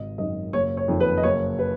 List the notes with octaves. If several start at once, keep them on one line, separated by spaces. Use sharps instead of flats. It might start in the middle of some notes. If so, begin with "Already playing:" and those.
Already playing: G#1 D#5
F#2 D#3 D#5
F#1 C#5
C#5
F2 D#3
B4
D#5
F#1 C#5
B4